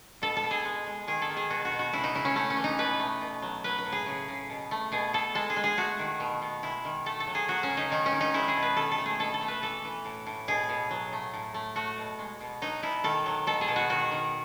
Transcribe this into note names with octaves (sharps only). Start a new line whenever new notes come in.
B2 A4
A4
B2
G#4
G#3
G#3
D#3 G#4
A4
D#3
G#4
B2 F#4
F#4
B2
F#4
C#3 E4
D#4
C#3 E4
C#4
A3 C#4
C#4
E3
D#4
B2 B4
A3
B2
F#3
F#3 B4
B4
A2
G#4
C#3
C#3
B2
A3
B2 G#4
B2 A4
G#3 A4
G#4
G#3
G#4
A3 F#4
D#3
B2
B2
G#3 E4
D#3
A3 A4
A4
F#3
G#4
F#3 F#4
C#4
C#3
D#4
D#3 D#4
C#4
D#3
D#4
G#3 E4
G#4
B2
B4
D#3 A4
A4
A3
G#4
B2 A4
A4
A3
B4
E3 A4
E3
A2
A2
B2 G#4
B2
F#3
A3
A2
A3
A3 F#4
B2
G#3
B2
F#3 D#4
B2 E4
D#3 A4
F#3
B2 A4
G#4
B2
F#4
D#3 F#4
D#3